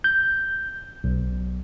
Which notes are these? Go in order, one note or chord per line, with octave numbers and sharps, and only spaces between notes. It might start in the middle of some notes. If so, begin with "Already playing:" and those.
G6
B1